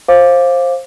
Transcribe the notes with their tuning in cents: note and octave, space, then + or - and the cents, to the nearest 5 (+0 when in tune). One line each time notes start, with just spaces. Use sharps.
C5 +20 F5 +0 D6 +0